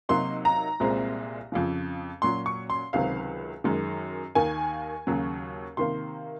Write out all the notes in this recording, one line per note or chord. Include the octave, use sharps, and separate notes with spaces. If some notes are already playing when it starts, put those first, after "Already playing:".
C3 F#3 A#3 D#4 C6
A#5
C2 A#2 G#3 C4
F2 C#3 F3
A#2 F#3 C#4 C6
C#6
C6
C#2 C3 D#3 F#3 C4 F5
F#2 D#3 G#3
D#2 D#3 A#3 G#5
D#2 C#3 F#3 C#4
C3 D#3 A#3 C6